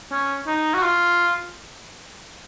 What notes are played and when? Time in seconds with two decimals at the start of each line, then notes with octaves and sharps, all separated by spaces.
0.12 C#4
0.47 D#4
0.74 F#4
0.82 F4